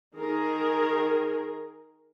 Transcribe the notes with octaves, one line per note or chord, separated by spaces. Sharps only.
D#3 G#4 A#4